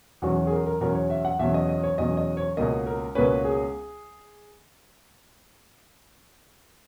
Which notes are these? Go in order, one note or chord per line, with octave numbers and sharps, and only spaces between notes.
E2 B2 F#3 C#4 F#4
G#4
A#4
A#4
E2 B2 F#3 C#4 A#4
C#5
E5
F#5
E2 B2 F#3 C#4 E5
D#5
D#5
C#5
E2 B2 F#3 C#4 D#5
D#5
C#5
C#2 B2 A#3 C#4 D#5
A#4
C#2 B2 A#3 C#4 B4
G#4